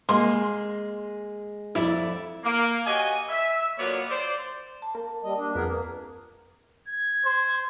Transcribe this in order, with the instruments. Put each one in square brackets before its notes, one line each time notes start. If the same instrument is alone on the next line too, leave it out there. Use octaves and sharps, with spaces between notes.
[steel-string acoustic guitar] G#3 [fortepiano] A#3 C6
[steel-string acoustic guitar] F2 D5 E5 [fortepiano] E4
[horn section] A#3
F#4 G4 C#5 D#5 G#5
E5
A#2 D3 F#3 A#3 B3 C#5
C5 D5
[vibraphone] A5
[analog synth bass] A#3
[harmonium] G3 D#5
D4
[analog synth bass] F2 [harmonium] B3 G#4 A#4 [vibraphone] B4
[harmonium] A#3
[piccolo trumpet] G#6
[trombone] C5